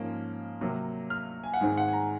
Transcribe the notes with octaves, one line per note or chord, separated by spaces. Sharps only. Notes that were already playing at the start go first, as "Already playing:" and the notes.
Already playing: G#2 F3 A#3 C#4
C3 F#3 A#3
F6
G#5
F#5
G#2 D#3 G#3 C4 G#5
F#5
G#5
A#5